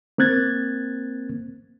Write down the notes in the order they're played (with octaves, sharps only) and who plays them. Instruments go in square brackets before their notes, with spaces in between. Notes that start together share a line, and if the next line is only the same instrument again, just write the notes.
[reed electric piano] A#3 C4 F#6 G#6 A6